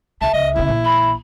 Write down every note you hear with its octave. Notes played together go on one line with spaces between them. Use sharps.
C2 E5 A5
C#2 D#5
E1 C#3 E4
A#1 E3
B5